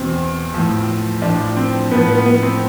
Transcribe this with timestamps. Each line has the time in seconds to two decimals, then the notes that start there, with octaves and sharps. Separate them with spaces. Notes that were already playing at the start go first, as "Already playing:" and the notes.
Already playing: E2 B2 C4
0.54 A2 F3
1.22 A2 F3 D4
1.57 C4
1.91 A2 F3 B3
2.08 B3
2.25 B3
2.42 C4